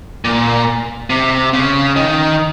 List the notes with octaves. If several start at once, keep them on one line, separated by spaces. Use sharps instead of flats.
A#2
C3
C#3
D#3